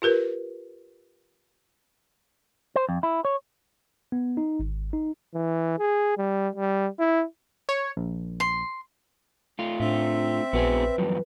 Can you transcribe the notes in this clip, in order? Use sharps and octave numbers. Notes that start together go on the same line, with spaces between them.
F4 G4 A#4 B4
C5
F2
E4
C#5
B3
D#4
G#1
D#4
E3
G#4
G3
G3
E4
C#5
A#1
C6
A3 F4
A2 C4 D4 E5
A#1 B3 F#4 G#4 B4
E2 G2 F3 F#3